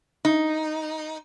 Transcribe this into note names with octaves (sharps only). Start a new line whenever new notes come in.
D#4